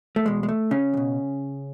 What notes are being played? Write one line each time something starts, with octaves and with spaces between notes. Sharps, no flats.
A3
E2 B2 G#3
G#3
A3
C#3 C#4
E2
B2